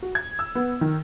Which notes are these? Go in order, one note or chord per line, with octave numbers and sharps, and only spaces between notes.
F#4
G#6
E6
B3
D#3